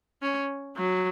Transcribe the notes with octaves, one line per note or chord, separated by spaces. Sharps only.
C#4
F#3